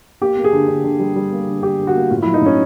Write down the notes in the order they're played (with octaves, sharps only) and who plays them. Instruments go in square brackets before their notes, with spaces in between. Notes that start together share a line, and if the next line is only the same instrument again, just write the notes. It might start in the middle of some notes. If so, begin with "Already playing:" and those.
[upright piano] A#3 G4
A#3
G#4
D3
D3
D3
G3
G3
A#3
D3
D3 G4
D3
F#4
A#3
A2 F4
E4
F#3
D#4
A2 C#4